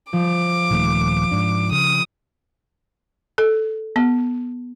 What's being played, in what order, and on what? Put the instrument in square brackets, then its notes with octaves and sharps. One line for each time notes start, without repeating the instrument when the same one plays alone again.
[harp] F3 [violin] D6
[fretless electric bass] D#1 D#3 A3
G#2 D4
[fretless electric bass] C#3 [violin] D#6
[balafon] A4
B3